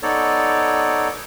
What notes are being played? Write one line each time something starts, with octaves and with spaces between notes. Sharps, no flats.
B3 D#4 A4 C#5 D5